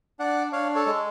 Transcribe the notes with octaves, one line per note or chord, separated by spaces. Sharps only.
D4 D5 F#5
D4 C#5 F5
A4 C#5
G#3